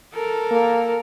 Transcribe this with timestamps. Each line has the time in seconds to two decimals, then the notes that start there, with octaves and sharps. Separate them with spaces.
0.13 A4 A#4
0.51 A#3